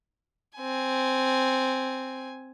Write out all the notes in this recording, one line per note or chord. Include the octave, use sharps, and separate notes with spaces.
C4 G#5